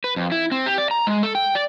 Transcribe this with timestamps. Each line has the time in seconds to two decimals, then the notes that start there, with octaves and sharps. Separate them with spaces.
0.04 B4
0.16 F2
0.32 E4
0.52 C4
0.66 G4
0.78 D5
0.91 A#5
1.07 G#3
1.23 A4
1.35 G5
1.55 D5